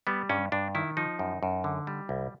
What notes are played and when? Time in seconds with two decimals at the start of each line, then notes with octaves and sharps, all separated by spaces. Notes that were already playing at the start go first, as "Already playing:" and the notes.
0.07 G3 B3
0.29 G2 C#4
0.52 G2 D4
0.75 D#3 E4
0.97 F3 D#4
1.19 F#2
1.43 F#2
1.64 D3
1.87 G3
2.09 C2